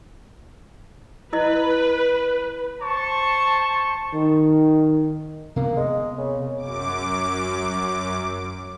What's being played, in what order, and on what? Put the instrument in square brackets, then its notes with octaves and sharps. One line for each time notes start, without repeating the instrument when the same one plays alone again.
[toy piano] E4 D#5 [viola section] B4
[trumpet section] C5 A5 C#6
[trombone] D#3
[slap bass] C3 B3 [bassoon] A#3
[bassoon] G#3
C#3
[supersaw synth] F#2 D6